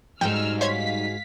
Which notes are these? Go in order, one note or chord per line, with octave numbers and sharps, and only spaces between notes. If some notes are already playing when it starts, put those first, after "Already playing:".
G#2 G3 D#4 F#4 G#4 G5 E6 F6
C5 C#5 F5 G#6 B6